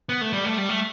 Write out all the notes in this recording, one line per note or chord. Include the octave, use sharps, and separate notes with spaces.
B3
A3
G3
A3
G3
A3